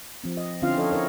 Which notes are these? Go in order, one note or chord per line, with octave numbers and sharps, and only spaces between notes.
F3 C4
D#5
D3 C4 C#4 E4 F4 F5
F3 A4 C#5 D#5
E4 A#4 C#5 D#5